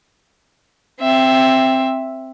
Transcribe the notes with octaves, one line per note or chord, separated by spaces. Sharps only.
C4 E5